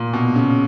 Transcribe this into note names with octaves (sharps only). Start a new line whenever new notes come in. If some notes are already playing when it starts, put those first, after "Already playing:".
Already playing: A#2
B2
C#3